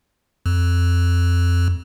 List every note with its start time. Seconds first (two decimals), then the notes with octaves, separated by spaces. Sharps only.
0.46 F2